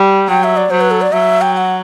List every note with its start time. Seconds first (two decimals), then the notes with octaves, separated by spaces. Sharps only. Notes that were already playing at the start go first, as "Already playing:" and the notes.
Already playing: G3
0.29 F#3 G5
0.44 E5
0.57 D5
0.70 F#3 C5
0.81 B4
0.91 A4
1.02 D5
1.13 F#3 E5
1.41 G5
1.53 G5
1.57 F#5